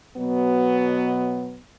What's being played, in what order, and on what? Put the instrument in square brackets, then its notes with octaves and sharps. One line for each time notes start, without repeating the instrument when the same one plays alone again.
[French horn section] B2 F#3 B3